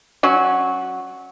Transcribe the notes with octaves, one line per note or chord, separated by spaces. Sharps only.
F#3 C#4 F#4